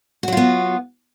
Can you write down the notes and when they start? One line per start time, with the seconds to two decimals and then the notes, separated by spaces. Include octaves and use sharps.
0.23 F#4
0.28 F#3
0.32 F4
0.37 B3